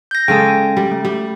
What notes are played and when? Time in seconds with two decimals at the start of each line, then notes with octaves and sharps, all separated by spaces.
0.11 G6 A#6
0.28 C#3 G#3 A4 G5 G#5
0.77 G3
0.92 A3
1.05 G3